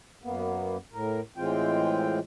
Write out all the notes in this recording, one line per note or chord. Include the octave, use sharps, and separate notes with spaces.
F#2 A#3 B3
A2 A#4
A2 E3 G#3 C4 F4 G5